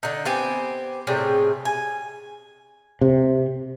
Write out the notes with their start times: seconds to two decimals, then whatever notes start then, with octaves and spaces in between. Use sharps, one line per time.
0.03 D3 D#4
0.25 B3 C4 G4 G#5
1.07 A2 C3 G3 G#4
1.65 G#5
3.01 C3